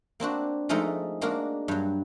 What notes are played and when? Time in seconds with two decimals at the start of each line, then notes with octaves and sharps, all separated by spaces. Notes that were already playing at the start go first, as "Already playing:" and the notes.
0.20 A#3 C4 D4 F#4
0.69 F3 G#3 A3 D#4 A4 A#4
1.21 G#3 A#3 D4 F#4 G#4 A#4
1.68 G2 F#3